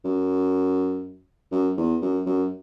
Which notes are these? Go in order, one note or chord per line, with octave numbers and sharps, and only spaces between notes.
F#2
F#2
E2
F#2
F#2